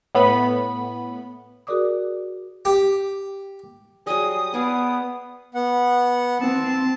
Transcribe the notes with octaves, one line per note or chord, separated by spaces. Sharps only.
A2 B3 B5
F#4 G#4 A#4 D5 D6 D#6
G4
F#3 G3 G#4 D#6
B3 G#4 D5 F5
B3 F#5
C4 A5